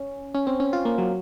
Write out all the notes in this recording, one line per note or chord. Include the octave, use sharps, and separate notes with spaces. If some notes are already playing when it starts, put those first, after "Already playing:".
Already playing: C#4
C#4
C4
C#4
F4
A#3
F#3